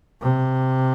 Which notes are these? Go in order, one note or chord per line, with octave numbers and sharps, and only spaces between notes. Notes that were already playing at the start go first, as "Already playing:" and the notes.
C3